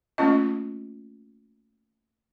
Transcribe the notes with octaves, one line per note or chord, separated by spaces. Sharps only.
A3 A#3 C#4 F4 D#5